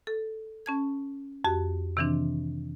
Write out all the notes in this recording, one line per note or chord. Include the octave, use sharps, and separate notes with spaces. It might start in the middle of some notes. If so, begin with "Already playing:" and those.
A4
C#4 A5 G#6
F2 F#4 G4
C3 D#3 E3 C4 D4